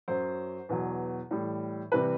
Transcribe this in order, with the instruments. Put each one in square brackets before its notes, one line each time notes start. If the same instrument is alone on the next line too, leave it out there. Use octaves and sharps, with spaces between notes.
[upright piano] F#2 F#3 C5
E2 B2 F#3
A2 E3 G3
C3 E3 G3 B4